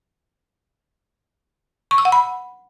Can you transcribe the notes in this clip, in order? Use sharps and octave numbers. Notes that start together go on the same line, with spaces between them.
C#6
E6
F#5
B5